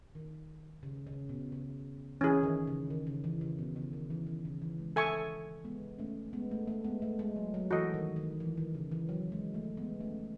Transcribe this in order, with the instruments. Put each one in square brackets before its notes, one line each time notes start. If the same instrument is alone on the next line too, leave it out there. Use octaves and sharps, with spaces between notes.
[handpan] D#3
C#3
C#3
B2
C#3
[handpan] E3 [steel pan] C#4 E4 G#4
[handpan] D#3
C#3
D#3
C#3
E3
C#3
B2
C#3
D#3
E3
D#3
C#3
E3
G#3
[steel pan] A4 E5 G#5 C#6
[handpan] G#3 B3
A3 C#4
G#3 B3
A3
A3
G#3 B3
A3
G#3
F#3
F#3
[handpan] E3 [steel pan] F#4 A4 D#5
[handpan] D#3
D#3
E3
D#3
C#3
E3
F#3
G#3
A3
G#3 B3
A3 C#4